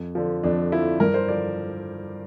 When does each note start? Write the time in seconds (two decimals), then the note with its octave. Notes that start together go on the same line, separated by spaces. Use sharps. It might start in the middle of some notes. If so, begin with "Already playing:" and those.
Already playing: F2
0.15 D3 F3
0.44 F2 D4
0.72 D3 F3 E4
1.00 G2 A#4
1.14 C5
1.28 D3 F3 D5